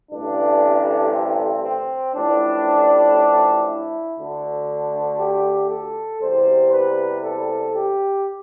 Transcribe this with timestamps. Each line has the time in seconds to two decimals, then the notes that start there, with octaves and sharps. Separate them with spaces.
0.12 A1 G2 D3 A3 D4
1.14 C4
1.64 C4
2.15 A1 A2 F3 D4
3.67 E4
4.18 D2 D3 A3
5.19 G4
5.70 A4
6.22 E2 C3 G3 C5
6.72 B4
7.23 A4
7.74 G4